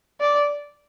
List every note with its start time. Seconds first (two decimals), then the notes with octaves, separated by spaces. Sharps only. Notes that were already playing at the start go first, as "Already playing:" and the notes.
0.21 D5